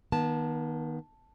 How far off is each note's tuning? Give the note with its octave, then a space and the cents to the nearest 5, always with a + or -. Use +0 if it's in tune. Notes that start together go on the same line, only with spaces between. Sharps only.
D#3 +0 B3 -40 A5 +0